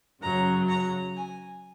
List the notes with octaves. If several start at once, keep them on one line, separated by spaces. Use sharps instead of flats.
F#2 C#3 F#3 A#5
A#5
G#5